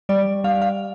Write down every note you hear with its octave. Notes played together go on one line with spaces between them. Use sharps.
G3 D5
G3 F5
F5